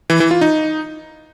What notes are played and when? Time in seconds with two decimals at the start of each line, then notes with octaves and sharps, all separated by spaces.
0.10 E3
0.20 E3
0.31 F4
0.41 D#4